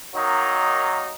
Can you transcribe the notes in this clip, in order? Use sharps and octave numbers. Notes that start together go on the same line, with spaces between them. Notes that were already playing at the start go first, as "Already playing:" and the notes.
D#3 F#3 A#3 D#4